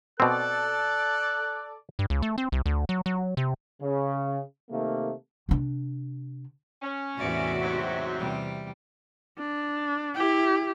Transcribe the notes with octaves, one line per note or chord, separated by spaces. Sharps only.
B2 C4 A4 D5 F#6
G2
C#2
A3
C4
C2
D2
F#3
F#3
C3
C#3
C3 D#3 A3 A#3
C3 D4
C#4
E2 A2 C3 F#4 D5 E5
G#2 F#3 C4
E2 C3 G3
D4
E4 G4